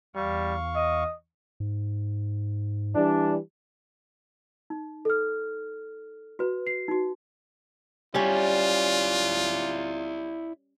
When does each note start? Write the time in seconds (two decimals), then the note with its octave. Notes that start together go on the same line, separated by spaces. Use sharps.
0.15 E2 G3 F5 C#6
0.75 D#5
1.60 G#2
2.95 E3 G3 D4
4.70 D#4
5.05 A4 F6
6.39 F#4 B4
6.67 C7
6.88 D#4 F#4
8.15 G3 C#4 E4 F4 D5